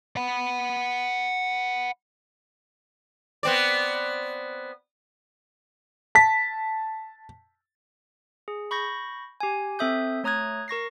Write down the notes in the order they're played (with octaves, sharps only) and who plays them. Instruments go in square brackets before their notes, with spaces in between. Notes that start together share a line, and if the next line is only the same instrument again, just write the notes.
[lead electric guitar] F#5 B5
[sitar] B3 C4 D5
[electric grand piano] A5 B6
[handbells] G#4
B5 C#6 G6 A#6
G4 G#5
C4 A4 E5 D#6 G6
A3 C#5 A#5 D#6 F#6 G#6
A#4 C#6 A#6 C7